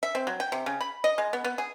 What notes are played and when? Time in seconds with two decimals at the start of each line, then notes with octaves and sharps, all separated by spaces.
0.03 E5
0.15 C4
0.27 F#3
0.40 G5
0.52 C3
0.66 C#3
0.81 B5
1.04 D#5
1.18 G#3
1.33 B3
1.45 B3
1.58 G#4